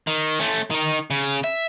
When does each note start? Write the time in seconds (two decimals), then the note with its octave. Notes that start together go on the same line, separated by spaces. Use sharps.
0.07 D#3
0.39 A3 C#4
0.70 D#3 D#4
1.11 C#3
1.44 E5